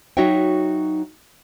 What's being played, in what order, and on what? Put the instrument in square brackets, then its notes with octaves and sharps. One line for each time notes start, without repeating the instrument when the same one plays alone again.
[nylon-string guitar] F#3 D#4 F#4 C#5 E5 G5